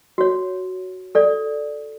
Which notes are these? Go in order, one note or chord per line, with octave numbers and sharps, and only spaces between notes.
F#4 C#5
A4 D5